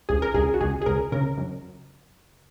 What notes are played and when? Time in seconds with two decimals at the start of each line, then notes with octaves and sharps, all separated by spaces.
0.09 C#2 G#4
0.22 A#4
0.34 C#2 G#4
0.54 F#4
0.61 C#2 G#4
0.82 G#4
0.86 C#2 A#4
1.12 C#3 A#4
1.38 F#2